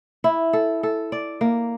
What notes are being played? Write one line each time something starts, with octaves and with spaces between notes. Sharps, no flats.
E4
A4
A4
D5
A#3